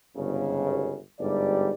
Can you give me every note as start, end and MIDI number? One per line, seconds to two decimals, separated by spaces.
0.16 0.96 31
0.16 0.96 44
0.16 0.96 49
1.19 1.71 31
1.19 1.71 44
1.19 1.71 55
1.19 1.71 74